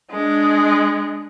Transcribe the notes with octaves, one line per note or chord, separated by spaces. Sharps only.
G#3 D4